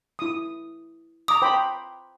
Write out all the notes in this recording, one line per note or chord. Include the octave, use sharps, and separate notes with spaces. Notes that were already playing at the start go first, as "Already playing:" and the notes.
E4 D#6
A#5 D6 D#6
C5 G5 B5